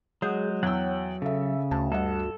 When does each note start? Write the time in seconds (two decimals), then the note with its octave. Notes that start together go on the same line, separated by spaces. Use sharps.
0.22 F#3 G#3 G#4 F#5 G6
0.63 E2 F#3 F#5 G5 E6
1.22 C#3 A4 E5
1.71 D2 A5
1.92 G2 A4 D#5 F#5